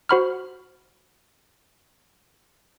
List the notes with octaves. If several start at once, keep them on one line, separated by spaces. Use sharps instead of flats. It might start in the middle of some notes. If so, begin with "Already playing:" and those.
F#4 C5 F#5 B5 C#6 F6